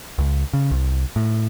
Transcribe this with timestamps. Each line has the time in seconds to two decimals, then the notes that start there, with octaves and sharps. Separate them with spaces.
0.18 C#2
0.53 C#3
0.71 C2
1.16 A2